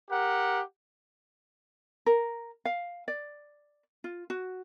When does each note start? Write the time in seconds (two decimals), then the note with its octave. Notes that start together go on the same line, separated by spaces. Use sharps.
0.11 G4 A#4 F#5
2.06 A#4
2.65 F5
3.08 D5
4.04 F4
4.30 F#4